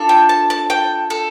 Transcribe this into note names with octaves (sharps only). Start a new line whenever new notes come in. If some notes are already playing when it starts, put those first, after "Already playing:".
Already playing: D4 F4 A4
G5
A5
A5
G5
A4